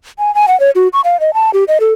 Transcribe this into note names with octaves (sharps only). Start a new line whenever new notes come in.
G#5
G#5
F#5
C#5
F#4
C#6
F5
D#5
A5
G4
D#5
A4